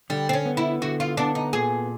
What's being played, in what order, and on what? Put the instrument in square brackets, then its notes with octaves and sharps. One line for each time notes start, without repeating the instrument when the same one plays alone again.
[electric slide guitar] D3 [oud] G3
[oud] C4
C#4
[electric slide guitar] B3
[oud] E4
[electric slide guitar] D3 [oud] F#4
[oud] F4
[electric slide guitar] B3 [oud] D4
[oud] D#4
[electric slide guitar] A#2 [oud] G#4